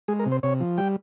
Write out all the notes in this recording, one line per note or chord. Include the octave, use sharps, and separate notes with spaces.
G#3 G#4
A#4
C3
C5
C3 C#5
F3
G3 G5